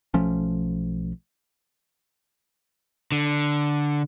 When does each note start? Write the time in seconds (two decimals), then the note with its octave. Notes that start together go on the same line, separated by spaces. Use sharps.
0.14 B1 F3 A3 C#4
3.12 D3